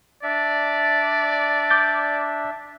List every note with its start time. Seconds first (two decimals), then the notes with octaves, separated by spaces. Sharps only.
0.23 D4 D5 E5
1.70 D6 G6 A6